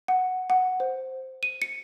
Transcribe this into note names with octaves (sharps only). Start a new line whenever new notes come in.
F#5
F#5
C5
D#7
C#7